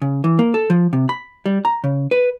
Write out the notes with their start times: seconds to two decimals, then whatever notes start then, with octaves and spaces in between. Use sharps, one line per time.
0.02 C#3
0.24 E3
0.39 A#3
0.54 A4
0.70 F3
0.93 C3
1.09 B5
1.46 G3
1.65 A#5
1.84 C#3
2.11 B4